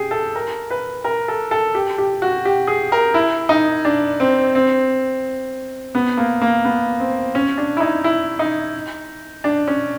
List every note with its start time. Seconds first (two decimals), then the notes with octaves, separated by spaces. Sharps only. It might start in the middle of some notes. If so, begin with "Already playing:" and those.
Already playing: G4 G#4
0.11 A4
0.35 A#4
0.70 B4
1.04 A#4
1.28 A4
1.51 A4
1.75 G4
1.98 G4
2.22 F#4
2.45 G4
2.68 G#4
2.92 A#4
3.14 E4
3.49 D#4
3.85 D4
4.20 C4
4.55 C4
5.95 B3
6.17 A#3
6.41 A#3
6.65 B3
7.00 C4
7.35 C#4
7.58 D4
7.77 E4
7.80 D#4
8.04 E4
8.39 D#4
9.44 D4
9.67 C#4